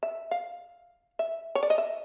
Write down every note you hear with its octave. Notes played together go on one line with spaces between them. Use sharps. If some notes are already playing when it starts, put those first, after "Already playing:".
E5
F5
E5
C#5
D5
D#5
E5